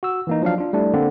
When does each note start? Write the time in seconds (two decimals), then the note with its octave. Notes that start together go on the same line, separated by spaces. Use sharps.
0.03 F#4 E6
0.27 E3 A#3 D#4
0.42 F3 F#3 D4 F5
0.58 D4 F4
0.73 G3 A3 D4 E4
0.93 D3 A#3 C4